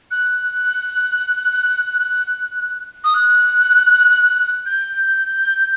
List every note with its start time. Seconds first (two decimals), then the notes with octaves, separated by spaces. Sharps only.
0.11 F#6
3.04 D#6
3.14 F#6
4.66 G6